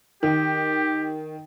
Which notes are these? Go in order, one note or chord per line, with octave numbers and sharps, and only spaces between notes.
D#3 G4